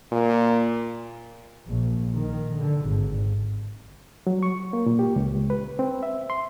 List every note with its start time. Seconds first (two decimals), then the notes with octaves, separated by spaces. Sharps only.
0.12 A#2
1.68 A#1
2.14 D#3
2.56 D3
2.88 G#1
4.27 F#3
4.43 C#6
4.73 A#3
4.86 A#2
4.99 G4
5.16 C#2
5.50 B4
5.79 C4
6.03 E5
6.30 C6